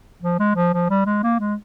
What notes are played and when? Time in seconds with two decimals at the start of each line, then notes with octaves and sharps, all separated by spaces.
0.22 F3
0.40 G#3
0.56 F3
0.74 F3
0.90 G3
1.06 G#3
1.23 A#3
1.40 G#3